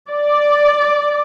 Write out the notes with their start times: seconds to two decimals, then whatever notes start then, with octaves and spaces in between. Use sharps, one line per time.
0.10 D5